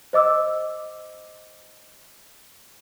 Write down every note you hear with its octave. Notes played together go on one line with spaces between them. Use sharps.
C5 D#5 D6 E6